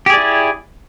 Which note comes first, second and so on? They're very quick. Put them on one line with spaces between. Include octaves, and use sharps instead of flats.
G4 G#4 D5 E4